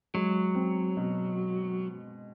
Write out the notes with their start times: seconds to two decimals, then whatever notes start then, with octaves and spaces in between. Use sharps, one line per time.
0.14 F#3 G#3
0.55 C4
0.97 B2